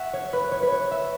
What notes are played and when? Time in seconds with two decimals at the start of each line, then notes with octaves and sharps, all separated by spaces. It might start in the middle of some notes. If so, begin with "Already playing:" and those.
Already playing: E5 F#5 C#6
0.13 C#5
0.33 B4
0.52 C#5
0.63 B4
0.72 C#5
0.91 E5